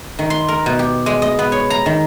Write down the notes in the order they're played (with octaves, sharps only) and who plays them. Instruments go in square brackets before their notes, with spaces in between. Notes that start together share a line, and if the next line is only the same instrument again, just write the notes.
[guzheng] D#3
C6
A#4
B2
G4
G#3
D#5
B3
C#5
A#5
D#3